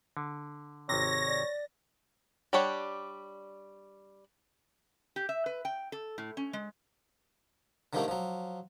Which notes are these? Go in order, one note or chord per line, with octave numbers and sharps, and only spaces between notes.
D3
G#1 C3 C#5 A#6
D5
G3 D4 G4 C#5 F#5
G4
E5
B4
G5
A4
A2
C#4
G#3
D3 D#3 F3 G3 A3 A#3
F3 F#3